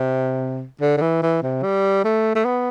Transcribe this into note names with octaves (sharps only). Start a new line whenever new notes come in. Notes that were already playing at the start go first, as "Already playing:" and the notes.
Already playing: C3
D3
D3
E3
E3
C3
G3
A3
A3
B3